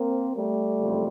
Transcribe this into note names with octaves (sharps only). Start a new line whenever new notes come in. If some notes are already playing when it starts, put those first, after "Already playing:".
Already playing: A#3 C4
G3 A3
F#1 F2